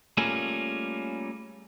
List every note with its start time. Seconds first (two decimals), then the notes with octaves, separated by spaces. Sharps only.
0.17 G3 A3 A#3 C#4 F4 G#4